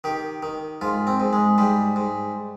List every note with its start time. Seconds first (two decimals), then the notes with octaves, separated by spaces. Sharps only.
0.04 D#3 G4
0.43 D#3
0.81 G#2 F4
1.07 C4
1.20 G#2
1.33 G#3
1.58 G#2 G3
1.96 G#2